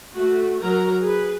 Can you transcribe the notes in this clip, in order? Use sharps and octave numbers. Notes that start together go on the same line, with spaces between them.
A3 F#4
F#3 A#4 A#5
G#4 B4